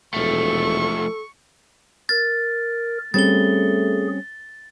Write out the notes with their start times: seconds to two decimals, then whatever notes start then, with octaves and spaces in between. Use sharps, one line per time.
0.14 E1 F3 A3 A4 C#6
2.09 A#4 A6
3.14 G3 A3 C4 C#4 G#4 A6 G7